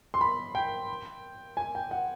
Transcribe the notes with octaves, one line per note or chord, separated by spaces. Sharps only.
C6
B5
G5
G#5
G5
F#5